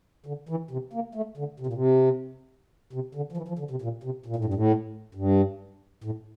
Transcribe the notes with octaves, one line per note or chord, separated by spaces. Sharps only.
D3
E3
C3
A#3
A3
D3
C3
A#2
C3
C3
D3
F3
E3
F3
D3
C3
A#2
C3
A#2
A2
G2
A2
G2
A2